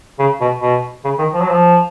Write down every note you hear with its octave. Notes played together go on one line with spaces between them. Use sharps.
C#3
B2
B2
C#3
D#3
F3
F#3
F3